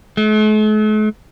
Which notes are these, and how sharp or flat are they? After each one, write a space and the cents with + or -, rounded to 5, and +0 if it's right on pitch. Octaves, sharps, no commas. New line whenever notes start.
A3 -45